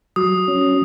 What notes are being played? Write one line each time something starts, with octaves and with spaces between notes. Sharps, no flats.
F#3 D#6
C#4